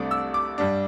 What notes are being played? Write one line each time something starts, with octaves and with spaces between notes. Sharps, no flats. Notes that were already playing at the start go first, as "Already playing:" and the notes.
Already playing: C2 C3 A3 D4 D6
E6
D6
G2 G3 D4